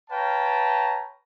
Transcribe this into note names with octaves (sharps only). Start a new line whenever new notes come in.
B4 C#5 F5 G5 A5 A#5